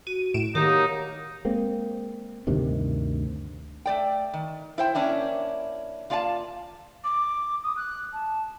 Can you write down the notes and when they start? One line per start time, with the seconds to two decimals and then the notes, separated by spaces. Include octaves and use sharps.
0.07 F#4 D#7
0.34 A2 D7 E7
0.55 D#3 F#3 A#3 D#4 G4
1.45 G#3 A#3 C4
2.47 D2 G2 C3 D#3
3.86 A3 D5 G5
4.33 D#3
4.78 E4 C5 G5
4.95 A#3 C#4 D4 E4
6.10 A#3 F4 D5 F5 G#5 A5
7.04 D6
7.63 D#6
7.76 F#6
8.13 A5